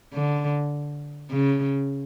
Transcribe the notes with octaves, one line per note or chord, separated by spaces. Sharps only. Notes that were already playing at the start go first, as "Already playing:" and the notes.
D3
C#3